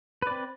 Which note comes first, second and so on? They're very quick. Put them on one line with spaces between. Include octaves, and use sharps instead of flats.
B4 D5 C4